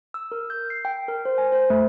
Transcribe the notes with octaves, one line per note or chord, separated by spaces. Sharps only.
E6
A#4
G6
C7
G5
A#4
C5
G#5
C5
A3